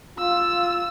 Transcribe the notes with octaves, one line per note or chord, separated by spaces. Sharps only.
F4 E6